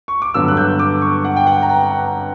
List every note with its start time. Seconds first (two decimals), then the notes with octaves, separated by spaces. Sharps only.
0.08 C#6
0.22 D6
0.34 G2 D3 F#3 B3 E6
0.48 F#6
0.57 G6
0.79 D6
1.02 C#6
1.25 F#5
1.36 G5
1.47 F#5
1.62 A#5
1.69 G5